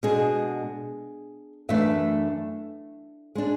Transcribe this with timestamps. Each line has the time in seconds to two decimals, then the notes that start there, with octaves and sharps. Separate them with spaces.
0.03 B2 G#3 D4 G#4
1.69 F#2 E3 A3 D4 E5
3.35 G#3 D4